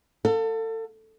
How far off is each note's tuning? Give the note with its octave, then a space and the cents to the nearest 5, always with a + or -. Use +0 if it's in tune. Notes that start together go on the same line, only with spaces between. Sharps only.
A4 +30 F5 +30